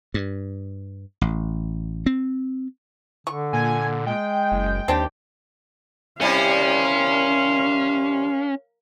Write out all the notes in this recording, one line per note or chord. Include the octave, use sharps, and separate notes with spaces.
G2
A1
C4
D3 C#6
A#2 G#5
G#3 G5
F#1
D#2 C4 D4 G4
C3 G3 C#4 E4 A#4 F5